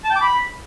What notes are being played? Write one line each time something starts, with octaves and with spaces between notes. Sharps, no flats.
A5
G5
D6
B5